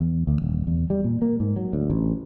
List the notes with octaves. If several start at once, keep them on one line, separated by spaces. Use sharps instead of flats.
E2
D2
D#1
E2
G3
A#2
A#3
G#2
F#3
D2
A1